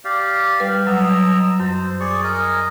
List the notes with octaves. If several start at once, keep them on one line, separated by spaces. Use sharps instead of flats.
G4 D5 F5
G3 B4
F#3 D#5 A#5 E6
F#2 C5
G#4 D5 C#6
A#4 D#5 G#5